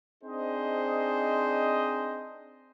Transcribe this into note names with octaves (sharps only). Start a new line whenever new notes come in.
C4 D4 D#4 G#4 C5 D#5